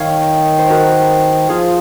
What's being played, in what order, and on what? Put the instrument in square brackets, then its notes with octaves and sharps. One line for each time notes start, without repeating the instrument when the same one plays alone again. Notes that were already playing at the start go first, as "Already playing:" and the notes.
Already playing: [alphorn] D#3 [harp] C#5 F5
[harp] C5
F#4 A#4
[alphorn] F3 [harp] F4 G#4